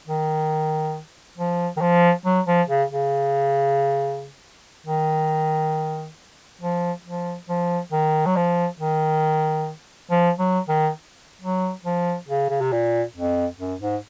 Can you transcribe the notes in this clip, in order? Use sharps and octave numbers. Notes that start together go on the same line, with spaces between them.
D#3
F3
D#3
F3
F#3
F3
C#3
C#3
D#3
F3
F3
F3
D#3
F#3
F3
D#3
F3
F#3
D#3
F#3
F3
C#3
C#3
C3
A#2
F2
F#2
G#2